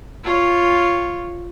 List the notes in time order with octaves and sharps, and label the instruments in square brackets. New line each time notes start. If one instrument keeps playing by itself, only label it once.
[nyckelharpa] F4 C#5